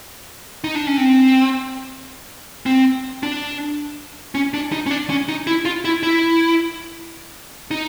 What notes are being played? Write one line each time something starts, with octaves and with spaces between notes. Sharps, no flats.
D#4
D4
C#4
C4
C4
D4
C#4
D4
D#4
C#4
D4
C#4
D#4
E4
F4
E4
E4
D#4